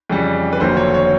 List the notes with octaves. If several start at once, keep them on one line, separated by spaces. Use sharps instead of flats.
F2 C#3 E3 G3
B4
F1 D#2 D3 F#3 C5
C#5
C#5